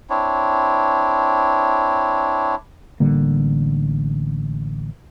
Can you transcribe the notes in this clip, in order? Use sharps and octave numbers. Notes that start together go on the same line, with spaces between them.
C4 D4 E4 C#5
A1 D3 G3 A#3